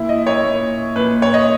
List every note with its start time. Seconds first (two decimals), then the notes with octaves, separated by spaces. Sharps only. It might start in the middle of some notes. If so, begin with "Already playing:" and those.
Already playing: A#2 E4
0.09 D#5
0.27 C#5
0.44 A#2
0.96 A#2 B4
1.22 C#5
1.34 D#5